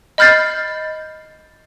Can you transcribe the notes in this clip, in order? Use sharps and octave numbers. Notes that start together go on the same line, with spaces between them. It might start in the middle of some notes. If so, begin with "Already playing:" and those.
D#5 B5 F6 G6 A6 C7